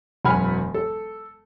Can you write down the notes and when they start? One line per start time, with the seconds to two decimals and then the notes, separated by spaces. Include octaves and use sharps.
0.25 E1 F#2 F#5 G#5 B5 F6
0.74 A4